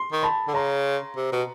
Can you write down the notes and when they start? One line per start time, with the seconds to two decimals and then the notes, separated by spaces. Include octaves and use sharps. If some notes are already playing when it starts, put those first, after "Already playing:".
Already playing: C6
0.12 D#3
0.23 A5 B5
0.47 D3
0.54 C#3 A#5 C6
1.17 C3
1.32 B2